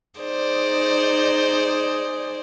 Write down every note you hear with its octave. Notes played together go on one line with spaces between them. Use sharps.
D#4 G#4 C5 D5